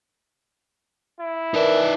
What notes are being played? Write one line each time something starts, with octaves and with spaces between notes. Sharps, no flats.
E4
E3 D#4 A#4 D5